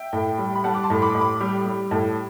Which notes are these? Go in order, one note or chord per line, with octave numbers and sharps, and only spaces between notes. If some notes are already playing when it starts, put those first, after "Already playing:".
Already playing: E5 G5
A2
G3
B5
G3 F#5 A5
D6
A5 C6
A2
B5 D6
A2
B5 D6
G3
G3
A2